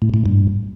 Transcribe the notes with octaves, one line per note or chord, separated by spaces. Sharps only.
A2
A2
G2